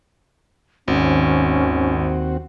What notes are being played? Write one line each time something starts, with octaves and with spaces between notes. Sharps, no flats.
G#1 D#2 C4 C#4 F#4